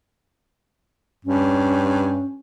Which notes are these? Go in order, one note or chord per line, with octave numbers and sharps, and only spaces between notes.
G2 C#4